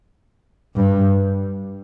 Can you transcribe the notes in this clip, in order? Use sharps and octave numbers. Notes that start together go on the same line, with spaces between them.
G2